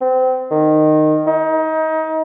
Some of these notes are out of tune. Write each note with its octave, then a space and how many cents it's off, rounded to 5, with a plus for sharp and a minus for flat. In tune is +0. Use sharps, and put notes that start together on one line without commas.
C4 -25
D#3 -15
D#4 +30